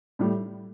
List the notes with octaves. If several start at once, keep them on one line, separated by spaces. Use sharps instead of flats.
A2 G3